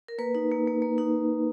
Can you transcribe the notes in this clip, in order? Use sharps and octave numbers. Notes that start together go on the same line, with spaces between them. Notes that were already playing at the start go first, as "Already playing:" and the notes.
A#4
A#3 B4
D#4
A#3
A#3
A#3
D#4